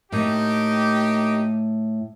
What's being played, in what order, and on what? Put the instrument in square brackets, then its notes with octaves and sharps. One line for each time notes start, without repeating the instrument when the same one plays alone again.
[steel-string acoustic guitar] A2 [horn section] A#3 D#4 G4